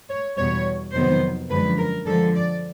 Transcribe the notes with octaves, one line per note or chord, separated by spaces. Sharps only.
C#5
E2 B2 G3 C#5
F2 C3 D#3 F#3 B3 C5
F#2 D3 F3 G#3 B4
A#4
D3 F3 G#3 A4
D5